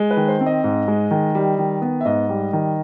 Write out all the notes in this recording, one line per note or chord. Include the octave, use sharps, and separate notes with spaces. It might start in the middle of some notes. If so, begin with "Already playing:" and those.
Already playing: G#3
B4
D#3
C5
C4
D#5
G#2
G#3
D#3
G3
D#3
B3
E5
G#2 D#5
G3
D#3